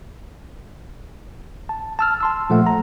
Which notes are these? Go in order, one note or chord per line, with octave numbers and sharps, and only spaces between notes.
A5
A5 E6 F6
A5 C6 E6
A#2 F3 A3 F#5
A#5